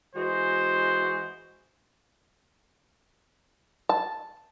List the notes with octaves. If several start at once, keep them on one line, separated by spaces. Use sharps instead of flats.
E3 G#3 F#4 C5
A5